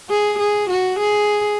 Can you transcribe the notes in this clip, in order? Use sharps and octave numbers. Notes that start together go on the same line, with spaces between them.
G#4
G#4
F#4
G#4